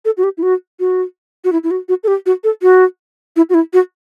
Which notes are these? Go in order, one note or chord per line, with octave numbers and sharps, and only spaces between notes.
A4
F#4
G4
E4
F#4
F#4
F#4
E4
E4
F#4
F#4
A4
G4
F#4
A4
F#4
E4
F#4
E4
F#4